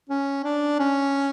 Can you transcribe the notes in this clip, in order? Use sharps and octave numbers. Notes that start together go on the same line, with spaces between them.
C#4
D4
C#4